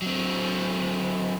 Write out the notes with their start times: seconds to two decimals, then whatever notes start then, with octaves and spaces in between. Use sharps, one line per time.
0.02 F#3 C4